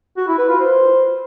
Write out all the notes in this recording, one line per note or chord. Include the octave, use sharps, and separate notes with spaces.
F#4
E4
B4
F4
C5